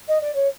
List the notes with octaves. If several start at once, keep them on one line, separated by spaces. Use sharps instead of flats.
D#5
D5
C#5